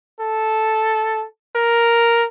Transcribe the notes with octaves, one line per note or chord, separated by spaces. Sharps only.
A4
A#4